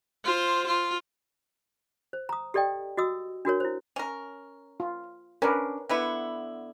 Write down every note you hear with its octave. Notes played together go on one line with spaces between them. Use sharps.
F4 C5
F4
C5
A#5 D#6
G4 A4 D5 D#5 G5
F#4 D#5 D#6 E6
D4 F#4 A#4 C#5
E4 C5
C#4 A#4
F4
C#4 D4 A#4 B4
D3 B3 E4